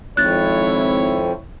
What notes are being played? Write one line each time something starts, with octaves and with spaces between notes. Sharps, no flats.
G#1 F2 E4 C#5 F#6 A6